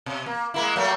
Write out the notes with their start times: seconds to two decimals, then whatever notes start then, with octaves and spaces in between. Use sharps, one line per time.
0.06 B2
0.26 A#3
0.54 G#3 A#3 E4
0.76 F#3 A3 A#3